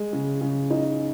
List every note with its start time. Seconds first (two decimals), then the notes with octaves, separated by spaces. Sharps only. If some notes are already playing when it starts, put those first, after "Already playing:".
Already playing: G#3
0.13 C#3
0.41 C#3
0.70 D#4